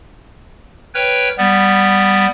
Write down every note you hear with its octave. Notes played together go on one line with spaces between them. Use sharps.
B4 C#5 G5 F6
G3 B3